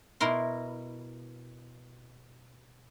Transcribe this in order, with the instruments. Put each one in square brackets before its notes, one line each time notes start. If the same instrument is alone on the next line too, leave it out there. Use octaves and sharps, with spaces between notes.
[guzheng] B2 E4 A#4 C6